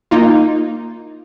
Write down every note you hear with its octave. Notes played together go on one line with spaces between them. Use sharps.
A#3 D#4 F4